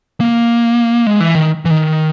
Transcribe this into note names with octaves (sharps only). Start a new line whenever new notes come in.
A#3
G#3
E3
D#3
E3
D#3